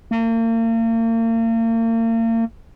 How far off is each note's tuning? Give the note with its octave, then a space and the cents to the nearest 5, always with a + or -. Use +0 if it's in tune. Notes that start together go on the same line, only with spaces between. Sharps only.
A#3 -40